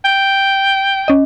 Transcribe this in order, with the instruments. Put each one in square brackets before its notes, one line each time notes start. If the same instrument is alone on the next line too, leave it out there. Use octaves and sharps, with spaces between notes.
[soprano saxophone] G5
[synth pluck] C#4 D#5